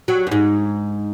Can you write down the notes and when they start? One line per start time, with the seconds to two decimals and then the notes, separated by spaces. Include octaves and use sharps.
0.08 F#3
0.27 F#2
0.32 G#2